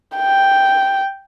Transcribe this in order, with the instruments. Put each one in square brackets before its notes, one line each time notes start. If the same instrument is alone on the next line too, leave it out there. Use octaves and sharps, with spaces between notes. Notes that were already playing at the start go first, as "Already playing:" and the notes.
[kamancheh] G5